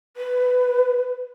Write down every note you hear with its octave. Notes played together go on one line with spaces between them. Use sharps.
B4